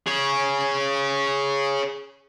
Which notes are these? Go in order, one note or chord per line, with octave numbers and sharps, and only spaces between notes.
G#4 C#5